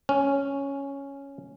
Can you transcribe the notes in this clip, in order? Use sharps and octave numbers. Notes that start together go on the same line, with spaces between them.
C#4